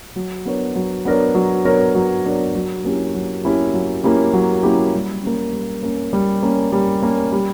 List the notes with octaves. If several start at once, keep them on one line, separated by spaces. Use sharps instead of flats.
F#3
B3 D4 A#4 C#5
F#3
B3 D4 A#4 C#5
F#3
B3 D4 A#4 C#5
F#3
B3 D4 A#4 C#5
F#3
A#3 C#4 E4 G4
F#3
A#3 C#4 E4 G4
F#3
A#3 C#4 E4 G4
F#3
A#3 C#4 E4 G4
G3
A#3 C#4
G3
A#3 C#4
G3
A#3 C#4
G3
A#3 C#4
G3